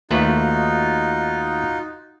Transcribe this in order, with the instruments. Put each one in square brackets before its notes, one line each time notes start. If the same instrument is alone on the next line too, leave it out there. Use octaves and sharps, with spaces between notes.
[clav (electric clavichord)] D#2 A3 B4 [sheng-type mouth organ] D#4 F4 F#4